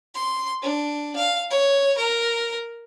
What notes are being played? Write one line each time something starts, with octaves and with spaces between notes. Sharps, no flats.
C6
D4
F5
C#5
A#4